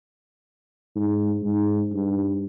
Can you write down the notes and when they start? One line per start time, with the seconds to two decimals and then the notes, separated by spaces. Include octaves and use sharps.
0.96 G#2
1.43 G#2
1.93 G2